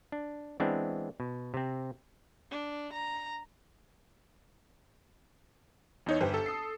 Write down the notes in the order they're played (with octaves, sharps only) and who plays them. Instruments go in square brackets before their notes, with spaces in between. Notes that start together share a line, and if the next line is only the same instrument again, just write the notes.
[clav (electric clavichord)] D4
E3 G#3 B3 C4 D4
B2
C3 C4
[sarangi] D4
A#5
[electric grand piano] E2 D#4 C#5
[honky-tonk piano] G1 G4 C5 [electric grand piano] B4
[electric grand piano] A4
[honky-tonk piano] D#6 C7